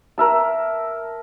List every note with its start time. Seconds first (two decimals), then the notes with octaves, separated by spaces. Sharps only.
0.18 A#4 E5 A5